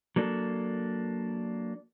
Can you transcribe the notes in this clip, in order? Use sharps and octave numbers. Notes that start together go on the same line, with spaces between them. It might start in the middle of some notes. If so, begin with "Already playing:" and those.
F#3 A#3 D4 A4